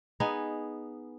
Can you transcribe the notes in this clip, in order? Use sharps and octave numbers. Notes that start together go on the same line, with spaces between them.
B3 D#4 G#4